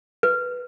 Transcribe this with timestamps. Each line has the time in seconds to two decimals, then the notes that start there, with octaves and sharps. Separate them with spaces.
0.23 B4